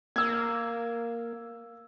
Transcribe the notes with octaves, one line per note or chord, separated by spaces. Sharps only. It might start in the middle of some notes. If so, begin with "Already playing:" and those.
A#3 E6 G#6